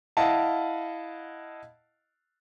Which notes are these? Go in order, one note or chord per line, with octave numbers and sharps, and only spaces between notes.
E4 D#5 F5 F#5 A5